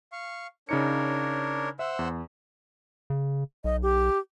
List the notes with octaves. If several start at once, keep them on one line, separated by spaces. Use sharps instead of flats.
F5 C#6
C#3 D4 D#4 A#4 C#5 C#7
C5 E5 F#5 E6
E2
C#3
B1 D#5
G4